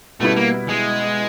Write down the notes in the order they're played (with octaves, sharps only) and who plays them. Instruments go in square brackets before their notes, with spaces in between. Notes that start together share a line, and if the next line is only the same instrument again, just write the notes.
[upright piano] B2 G3 B3 E4 [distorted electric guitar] A3
[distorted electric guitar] A#3
G#3